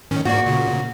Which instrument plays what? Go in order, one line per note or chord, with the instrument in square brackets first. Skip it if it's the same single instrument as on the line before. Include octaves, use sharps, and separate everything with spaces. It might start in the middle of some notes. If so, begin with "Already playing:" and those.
[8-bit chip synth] A2 D#3 C#4
[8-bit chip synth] G#2 A#3 D5 [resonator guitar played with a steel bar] F#4
[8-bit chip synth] A#2 C#3